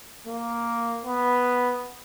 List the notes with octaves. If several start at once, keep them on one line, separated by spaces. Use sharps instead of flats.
A#3
B3